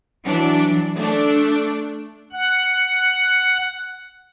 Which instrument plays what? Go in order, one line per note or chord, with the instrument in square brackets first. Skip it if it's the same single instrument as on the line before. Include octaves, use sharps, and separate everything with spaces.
[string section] E3 F#3 D4
A3 D4
[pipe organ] F#5 F#6